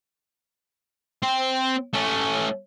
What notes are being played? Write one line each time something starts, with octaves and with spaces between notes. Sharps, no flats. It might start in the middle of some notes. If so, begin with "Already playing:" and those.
C4
A3 C#4